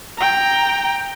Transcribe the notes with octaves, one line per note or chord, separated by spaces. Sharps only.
G5 A#5